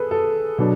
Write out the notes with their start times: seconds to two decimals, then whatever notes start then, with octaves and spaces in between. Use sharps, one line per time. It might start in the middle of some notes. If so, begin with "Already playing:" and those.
Already playing: G#4 A4 B4
0.11 A4
0.58 B2 F#3 B3 D4